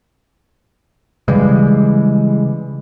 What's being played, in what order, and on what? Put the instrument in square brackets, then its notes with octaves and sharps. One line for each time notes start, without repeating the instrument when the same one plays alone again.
[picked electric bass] C#3 E3 G3 G#3